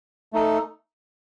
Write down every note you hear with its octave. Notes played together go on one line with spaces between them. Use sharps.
A3 D#4 A4